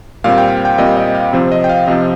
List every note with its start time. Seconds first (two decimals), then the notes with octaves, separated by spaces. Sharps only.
0.24 A#2 G3 C4 F5
0.38 G5
0.65 G5
0.78 A#2 G3 C4 D#5
0.97 D#5
1.15 F5
1.33 C3 F3 C4
1.51 D#5
1.64 G5
1.69 F5
1.87 C3 F3 C4 D#5